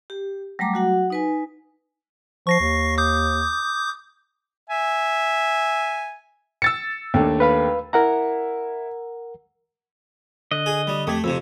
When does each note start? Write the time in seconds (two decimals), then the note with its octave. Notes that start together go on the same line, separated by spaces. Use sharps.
0.10 G4
0.59 F#3 G3 A3 A#5 D6
0.74 F#3 F#4 F#5
1.10 D#4 B4 G#5
2.47 F3 C#6 A#6 C7
2.60 D#2
2.98 D6 D#6 G6
4.70 E5 G#5
6.62 E6 A6 C#7
7.14 D#2 A3 D4
7.40 B4 F5 B5
7.93 E4 A#4 F#5 A#5
10.51 D3 D#5 F#6
10.66 G#4
10.87 G3
11.07 F2 A3 G4 G#6
11.24 F2 C3 E6